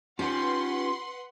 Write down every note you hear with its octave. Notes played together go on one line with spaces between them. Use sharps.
C#4 F4 G4 B4 F#5 C6